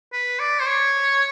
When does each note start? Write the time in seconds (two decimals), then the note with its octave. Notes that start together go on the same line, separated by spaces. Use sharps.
0.13 B4
0.40 D5
0.60 C5
0.67 C#5